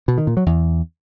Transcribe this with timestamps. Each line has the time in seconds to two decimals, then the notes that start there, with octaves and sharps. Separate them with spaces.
0.08 B2
0.18 D#3
0.27 A#2
0.37 F#3
0.46 E2